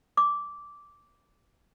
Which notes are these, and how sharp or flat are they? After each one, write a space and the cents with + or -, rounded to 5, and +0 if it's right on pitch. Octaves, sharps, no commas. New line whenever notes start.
D6 -10